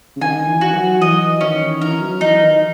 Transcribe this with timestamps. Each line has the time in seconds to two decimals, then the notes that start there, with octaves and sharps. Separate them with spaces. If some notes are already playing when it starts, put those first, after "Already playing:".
0.16 C#3
0.21 D#3 G#5
0.47 E3
0.61 F#4
0.74 F#3
1.02 E3 D#5
1.40 D#3 C#4
1.81 E3 A#4
2.01 F#3
2.20 E3 D#4
2.41 D#3